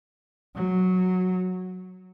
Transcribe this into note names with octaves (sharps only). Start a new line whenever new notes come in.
F#3